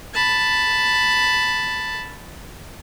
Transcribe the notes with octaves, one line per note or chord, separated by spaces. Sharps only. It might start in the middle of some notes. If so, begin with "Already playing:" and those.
A5 B5